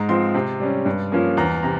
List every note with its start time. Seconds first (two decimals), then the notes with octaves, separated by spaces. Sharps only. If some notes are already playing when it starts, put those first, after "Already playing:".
Already playing: G#2 A#5
0.09 F3 C4 C6
0.34 C3
0.60 G3 C#4
0.86 G2
1.12 F3 A#3 C#4
1.37 E2 A#5
1.63 C3 A#5